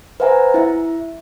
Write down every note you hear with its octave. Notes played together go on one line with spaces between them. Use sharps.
B4 C5 E5 F#5 G#5 A#5
E4 E5